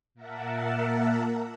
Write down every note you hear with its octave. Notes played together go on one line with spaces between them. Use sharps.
A#2 A#3 A#4 E5 F#5 A5